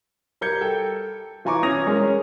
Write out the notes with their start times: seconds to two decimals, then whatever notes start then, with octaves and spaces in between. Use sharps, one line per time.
0.41 G3 A#4 G6 G#6 C#7
0.61 A4 G5
1.45 E3 F4 G#5 A#5 C#6 D6
1.63 C#4 D#6 G#6 A#6 F7
1.86 G#3 C#4 G#4 A#4 C#5